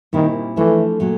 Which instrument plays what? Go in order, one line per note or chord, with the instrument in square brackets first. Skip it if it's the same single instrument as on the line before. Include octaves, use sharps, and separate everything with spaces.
[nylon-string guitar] A#2 G3 C4 E4 [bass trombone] D#3
[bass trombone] E3 [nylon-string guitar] F3 A3 D4
[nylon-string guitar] A#2 F#3 A3